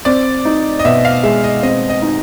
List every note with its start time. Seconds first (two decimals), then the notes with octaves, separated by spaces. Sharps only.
0.05 C4 D5
0.45 D#4
0.79 D#5
0.85 B2 E5
1.05 F5
1.23 G#3 E5
1.44 D#5
1.63 C4 D#5
1.90 D#5
2.02 D#4